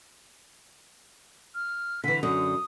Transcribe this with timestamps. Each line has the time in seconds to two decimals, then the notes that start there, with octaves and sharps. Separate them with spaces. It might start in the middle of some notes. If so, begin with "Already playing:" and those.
1.55 F6
2.04 D3 E3 B6
2.23 F#2 D3 D#6